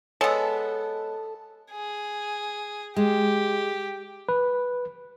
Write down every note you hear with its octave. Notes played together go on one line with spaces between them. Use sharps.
G#3 B3 A4 C#5 A5
G#4
G#3 G4
B4